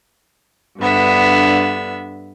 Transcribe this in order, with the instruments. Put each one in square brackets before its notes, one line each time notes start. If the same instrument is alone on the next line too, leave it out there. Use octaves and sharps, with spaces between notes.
[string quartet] G2 D3 B3 E5